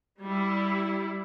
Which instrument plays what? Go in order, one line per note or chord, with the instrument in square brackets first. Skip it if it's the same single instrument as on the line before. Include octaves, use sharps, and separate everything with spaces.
[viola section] G3 E4